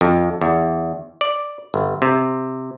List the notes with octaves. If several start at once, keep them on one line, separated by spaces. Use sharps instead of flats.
F2
E2
D5
G1
C3